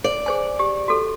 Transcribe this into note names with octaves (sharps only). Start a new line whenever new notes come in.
D5
G#4 C5 G#5
G4
F#4 A4